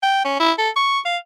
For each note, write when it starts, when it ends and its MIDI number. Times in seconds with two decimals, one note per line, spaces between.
0.03 0.23 79
0.25 0.37 61
0.40 0.52 64
0.58 0.70 69
0.76 0.99 85
1.05 1.17 77